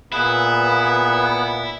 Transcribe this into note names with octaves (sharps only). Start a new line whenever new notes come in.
A#2 B3 E4 G#4 B4